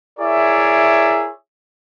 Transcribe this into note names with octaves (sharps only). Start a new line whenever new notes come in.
E4 G#4 A#4 C#5 D5 E5